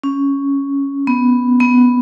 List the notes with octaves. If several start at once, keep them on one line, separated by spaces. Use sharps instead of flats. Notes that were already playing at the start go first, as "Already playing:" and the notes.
C#4
B3
B3